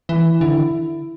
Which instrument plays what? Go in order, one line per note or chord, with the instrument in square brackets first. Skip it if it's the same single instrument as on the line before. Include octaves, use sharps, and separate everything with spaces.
[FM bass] E3 [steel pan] E4
[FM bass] D3 [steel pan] E4